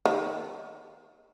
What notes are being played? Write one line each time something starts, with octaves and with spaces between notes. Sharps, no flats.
D#3